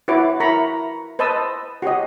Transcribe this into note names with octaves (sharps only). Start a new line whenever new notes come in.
E4 F#4 B4 C#5 D6
E4 A#4 A#5 B5 C#6
B4 C5 D#5 A5 D#6 E6
F#4 G4 C#5 D#5